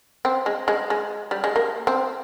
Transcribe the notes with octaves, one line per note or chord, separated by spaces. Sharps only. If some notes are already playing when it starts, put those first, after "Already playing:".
C4
G#3
G#3
G#3
G3
G#3
A#3
C4